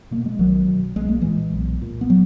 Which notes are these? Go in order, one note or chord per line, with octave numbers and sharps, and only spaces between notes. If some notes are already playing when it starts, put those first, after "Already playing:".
B2 A#3
G#3
B1 D#3 F#3
B2
B1 G#3
A#3
A#2 E3 G#3
B1
A#2
B3
F#3